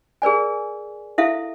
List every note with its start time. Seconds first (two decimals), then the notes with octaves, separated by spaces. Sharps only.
0.22 G#4 A#4 D5 G#5
1.18 E4 A4 E5 F5